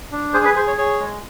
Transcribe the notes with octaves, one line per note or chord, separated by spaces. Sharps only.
D4
G#4 C5
B4
G#4 C5
C#5
G#4 C#5
G#3